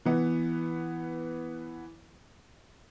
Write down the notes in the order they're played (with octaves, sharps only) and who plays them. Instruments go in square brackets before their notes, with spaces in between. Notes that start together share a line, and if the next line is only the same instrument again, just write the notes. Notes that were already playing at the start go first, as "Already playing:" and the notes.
[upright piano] E3 B3